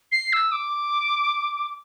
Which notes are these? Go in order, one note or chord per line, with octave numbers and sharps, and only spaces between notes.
C7
E6
D6